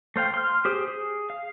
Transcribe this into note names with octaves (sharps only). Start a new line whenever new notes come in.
A3 C5 F5 G5
C6 F6
G4 G#4 C5
G#4
F5